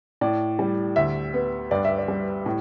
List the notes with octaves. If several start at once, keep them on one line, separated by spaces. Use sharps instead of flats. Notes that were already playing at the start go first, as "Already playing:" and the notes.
A2 D5
G3
D2 E5
B3
G2 D5
E5
D5
G3
A2